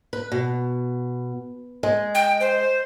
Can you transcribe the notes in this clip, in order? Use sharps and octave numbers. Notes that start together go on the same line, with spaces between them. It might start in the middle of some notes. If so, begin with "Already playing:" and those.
B4
B2
G#3
G5
C5